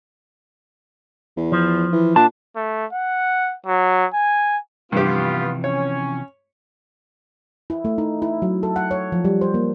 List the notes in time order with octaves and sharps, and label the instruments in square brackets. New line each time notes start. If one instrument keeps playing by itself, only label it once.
[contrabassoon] E2
[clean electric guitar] F3
[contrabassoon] E3
[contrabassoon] A#2 [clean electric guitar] D4 A5
[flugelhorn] A3
F#5
F#3
G#5
[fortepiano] G2 G4 [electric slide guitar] C3 E3 F3 [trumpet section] B3 F4
[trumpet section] C#4 [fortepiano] C#5
[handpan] E4
A3
D#4
E4
F#3
A4
F#5
C#5
F3
G3
C5
A#3